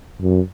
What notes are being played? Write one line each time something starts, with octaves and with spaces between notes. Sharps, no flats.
F#2